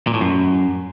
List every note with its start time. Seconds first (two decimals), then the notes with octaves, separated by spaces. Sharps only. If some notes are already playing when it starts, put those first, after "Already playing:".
0.07 A#2
0.14 A2
0.21 F#2